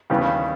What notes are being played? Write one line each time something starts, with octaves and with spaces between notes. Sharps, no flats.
D#2 C#3 E3 G3 B3